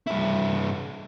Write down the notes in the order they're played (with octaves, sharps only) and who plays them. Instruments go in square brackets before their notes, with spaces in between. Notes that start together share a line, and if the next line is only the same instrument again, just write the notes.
[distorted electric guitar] G2 E4